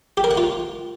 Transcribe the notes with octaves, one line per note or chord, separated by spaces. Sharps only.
G4
A#4
F#5
F4